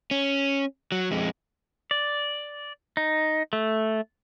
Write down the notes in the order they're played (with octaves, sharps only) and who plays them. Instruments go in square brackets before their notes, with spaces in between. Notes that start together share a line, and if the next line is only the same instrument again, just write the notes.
[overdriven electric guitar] C#4
F#3
F2 G#3
[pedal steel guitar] D5
D#4
A3